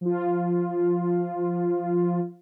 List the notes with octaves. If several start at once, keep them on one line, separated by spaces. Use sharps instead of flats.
F3 F4